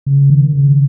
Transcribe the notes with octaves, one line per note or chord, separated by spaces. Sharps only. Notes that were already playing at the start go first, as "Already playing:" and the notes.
C#3
D#3
C#3